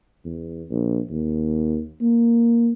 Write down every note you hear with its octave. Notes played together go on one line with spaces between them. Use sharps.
E2
A#1
D#2
A#3